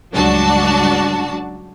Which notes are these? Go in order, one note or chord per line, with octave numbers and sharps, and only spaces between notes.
C#2 G2 F#3 D4 F#4 A5